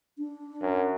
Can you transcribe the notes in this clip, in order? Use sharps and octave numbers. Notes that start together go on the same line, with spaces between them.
D4
F#2